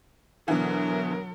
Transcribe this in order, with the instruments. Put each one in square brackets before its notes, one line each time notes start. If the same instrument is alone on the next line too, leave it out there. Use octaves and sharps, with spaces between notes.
[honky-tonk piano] B2 D3 E3 [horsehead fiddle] F#3 A#4